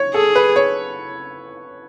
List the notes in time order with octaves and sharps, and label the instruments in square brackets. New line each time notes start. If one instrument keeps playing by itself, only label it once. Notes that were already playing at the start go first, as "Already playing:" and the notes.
Already playing: [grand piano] C#5
[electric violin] G#4 [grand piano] A4
[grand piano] B4
C#5